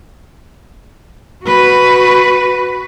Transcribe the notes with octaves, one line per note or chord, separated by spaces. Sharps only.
F#4 B4